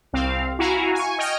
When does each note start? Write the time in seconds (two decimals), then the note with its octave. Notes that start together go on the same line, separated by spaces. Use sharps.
0.13 C2 C4 F5
0.59 E4 F#4 F5 G#5 A#5
0.95 G#5 C#6
1.18 D#5 G5 F6